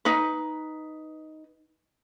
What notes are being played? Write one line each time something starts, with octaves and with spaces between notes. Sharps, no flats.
D#4 B4